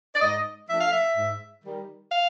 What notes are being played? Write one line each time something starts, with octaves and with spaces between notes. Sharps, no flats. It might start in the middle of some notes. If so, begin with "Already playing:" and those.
D5
G#2 D#5
F3 A3 D4 E5
F5
E5
G#2
D#3 G3
F5